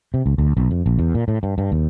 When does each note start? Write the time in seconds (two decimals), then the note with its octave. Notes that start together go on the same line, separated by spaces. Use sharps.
0.14 C3
0.26 C#2
0.38 D2
0.57 B1
0.71 F2
0.86 A#1
0.99 E2
1.15 A#2
1.28 A2
1.43 G2
1.58 G2
1.72 D#2